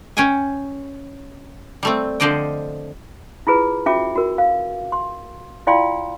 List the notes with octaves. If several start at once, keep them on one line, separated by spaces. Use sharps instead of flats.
C#4 G5 G#5
G3 A3 C4
D3 F3 C5 D5 D#5 G5
E4 F4 G#4 B4
C#4 F4 F#4 E5 G5 D6
F#4 A#4
F5
C6
E4 F4 D5 F5 G5 C6